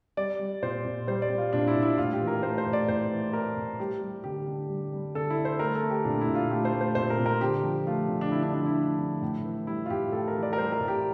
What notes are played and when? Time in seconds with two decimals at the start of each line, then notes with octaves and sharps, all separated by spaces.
0.17 G3 D5
0.39 G3
0.62 A#2 C5
0.85 A#2
1.07 G3 C5
1.22 D5
1.30 G3
1.38 F4
1.53 A#2 D4
1.67 E4
1.76 A#2
1.82 E4
1.98 A2 F4
2.13 G4
2.21 E3
2.28 A#4
2.43 A3 C5
2.58 C5
2.66 A2
2.73 D5
2.88 A2 C5
3.11 E3
3.33 A3 A#4
3.57 A2
3.79 G3 G4
4.01 G3
4.24 D3 G4
4.47 D3
4.69 G3
4.92 G3
5.15 D3 A4
5.30 E4
5.38 D3
5.45 C5
5.59 A3 A#4
5.75 A4
5.83 A3
5.90 G4
6.05 A#2 D4
6.21 E4
6.28 A#2
6.35 F4
6.50 A3 G4
6.65 C5
6.73 A3
6.81 C5
6.95 A#2 C5
7.10 A#4
7.18 A#2
7.26 A#4
7.41 D3 G4
7.64 F3
7.87 A3 F4
8.09 D3
8.21 D4
8.31 D3 E4
8.43 D4
8.54 F3 D4
8.66 E4
8.77 A3
8.99 D3
9.22 A2
9.45 E3
9.67 G3 E4
9.86 F4
9.90 A2 G4
10.12 A2 A4
10.28 A#4
10.35 E3
10.43 D5
10.53 A#4
10.58 G3 C5
10.72 A#4
10.81 A2
10.88 G4